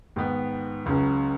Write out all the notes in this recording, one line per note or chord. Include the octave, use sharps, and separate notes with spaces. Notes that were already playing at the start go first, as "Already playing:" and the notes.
G#2 D#3 B3
C#2 C#3 F#3 C#4